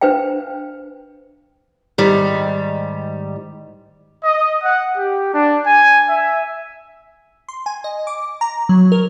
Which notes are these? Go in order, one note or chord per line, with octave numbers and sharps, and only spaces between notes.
D4 B4 C5 F5 G5
G#2 D#3 G3
D#5
F#5
G4
D4
G#5
E5
C6
G#5
D#5
D6
A#5
F#3
A#4